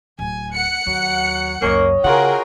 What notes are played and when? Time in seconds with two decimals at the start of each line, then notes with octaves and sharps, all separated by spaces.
0.19 D1 G#5
0.55 F#5 F#6 C#7
0.87 D#2 F#3
1.62 C#2 F#2 A#3 C#4 C#5 D#5
2.04 C#3 F4 F#4 G#4 A#4 F#5 G5